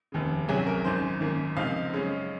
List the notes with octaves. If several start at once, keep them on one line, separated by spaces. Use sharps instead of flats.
F1 D#2 C#3
C2 C3 F#3 C#4 G#4
A#4
G#1 F#2 D#3 C5
G#1 F#2 D#3 A#3
C#2 C3 F3 C4 D#4 F5
F#2 C#3 G#3 C#4